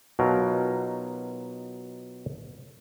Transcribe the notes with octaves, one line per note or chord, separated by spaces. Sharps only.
B2 F#3 D#4 F4 A#4